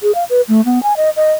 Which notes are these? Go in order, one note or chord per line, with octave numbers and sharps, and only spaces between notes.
G#4
F5
B4
A3
B3
G#5
D#5
D#5